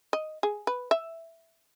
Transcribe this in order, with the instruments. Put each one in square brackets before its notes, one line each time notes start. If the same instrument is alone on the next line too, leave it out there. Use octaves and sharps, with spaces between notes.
[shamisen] D#5
G#4
B4
E5